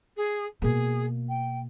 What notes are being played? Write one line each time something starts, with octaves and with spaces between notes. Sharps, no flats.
G#4
B2 A#3 G#4
G5